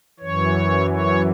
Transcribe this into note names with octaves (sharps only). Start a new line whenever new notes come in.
F#2 E3 C#5
C#5